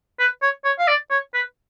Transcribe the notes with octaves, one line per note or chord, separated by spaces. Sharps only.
B4
C#5
C#5
F5
D5
C#5
B4